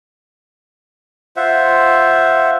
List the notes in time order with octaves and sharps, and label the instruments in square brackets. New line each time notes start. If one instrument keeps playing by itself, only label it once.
[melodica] F4 C5 E5 F#5